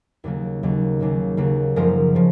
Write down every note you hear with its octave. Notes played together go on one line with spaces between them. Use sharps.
D#2 C#3 F#3 A#3
D#2 C#3 F#3 A#3
D#2 C#3 F#3 A#3
D#2 C#3 F#3 A#3
F#2 C#3 F3 G#3 A#4
C#3 F3